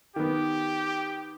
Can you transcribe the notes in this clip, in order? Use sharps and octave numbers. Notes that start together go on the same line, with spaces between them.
D#3 B3 G4